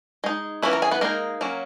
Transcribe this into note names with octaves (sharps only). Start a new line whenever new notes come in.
G#3 D#4
E3 A#3 C#4 E4 B4 B5
A#4 A#5
G#4 G#5
B3 B4
G#3 A#3 D#4 A#4
F#3 A#3 C#4